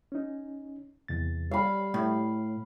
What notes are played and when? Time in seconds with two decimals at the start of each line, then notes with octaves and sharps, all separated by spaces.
0.12 C#4 D#4
1.08 E2 C3 A6
1.51 G3 C#5 F5 B5
1.94 A2